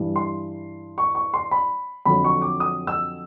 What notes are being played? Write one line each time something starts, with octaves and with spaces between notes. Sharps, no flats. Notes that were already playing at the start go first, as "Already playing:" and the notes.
Already playing: G2 E3 G3
C6
C#6
C#6
C6
B5
F2 D3 F#3 B5
C#6
D6
D#6
E6